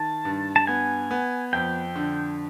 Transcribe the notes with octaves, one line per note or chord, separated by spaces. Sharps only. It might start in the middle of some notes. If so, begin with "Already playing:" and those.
Already playing: D#3 A5
G2
A5
B3 G#5
B3
F2 G5
D3